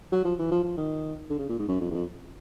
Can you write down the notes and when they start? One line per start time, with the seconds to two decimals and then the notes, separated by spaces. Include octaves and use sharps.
0.12 F#3
0.25 F3
0.39 E3
0.52 F3
0.64 F3
0.77 D#3
1.30 D3
1.39 C#3
1.49 A#2
1.59 G#2
1.68 F#2
1.81 F2
1.91 E2
1.95 F2